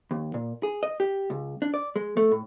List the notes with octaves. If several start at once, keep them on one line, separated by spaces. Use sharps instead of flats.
D#2
A#2
G#4
D#5
G4
C#2
D4
D5
G#3
A3
A2